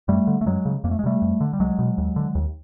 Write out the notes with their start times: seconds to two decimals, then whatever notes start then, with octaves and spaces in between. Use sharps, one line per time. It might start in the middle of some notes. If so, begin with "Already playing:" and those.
0.08 F#2 G3 A3
0.27 D3
0.41 A3
0.46 F#2 F#3 G#3
0.65 C#3
0.84 F2 A#3
0.91 A3
0.99 G#3
1.04 C3 G3 A3
1.22 F2
1.41 D3
1.53 G3
1.60 C2 F#3 G#3
1.79 B2
1.98 D#2
2.16 D3
2.35 D#2